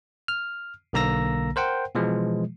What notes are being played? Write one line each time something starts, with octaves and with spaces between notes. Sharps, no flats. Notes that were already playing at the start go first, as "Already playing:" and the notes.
F6
B1 D3 A#3 A#5 E6 A#6
A#4 C5 F#5 G5
B2 E3 F3 G#3